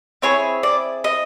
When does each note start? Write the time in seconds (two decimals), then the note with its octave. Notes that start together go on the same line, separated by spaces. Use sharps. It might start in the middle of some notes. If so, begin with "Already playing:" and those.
0.22 C4 E4 G#4 C#5
0.63 D5
1.04 D#5